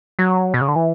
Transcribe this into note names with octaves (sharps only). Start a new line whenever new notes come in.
F#3
B2
C#3
D3
E3